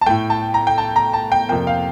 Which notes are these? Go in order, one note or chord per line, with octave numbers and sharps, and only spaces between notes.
A5
A2 A3 G5
A5
A#5
G5
A5
A#5
A5
G5
F2 C3 F3 A#3 G5
F5